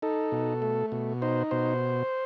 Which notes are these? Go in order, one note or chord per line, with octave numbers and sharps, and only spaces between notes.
D#4 A4
B2
A3
B2
D#4 C5
B2 C5